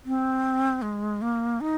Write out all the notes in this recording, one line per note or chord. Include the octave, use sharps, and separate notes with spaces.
C4
G#3
A#3
D#4